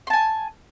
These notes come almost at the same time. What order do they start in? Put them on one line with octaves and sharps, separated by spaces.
C6 A5 G#5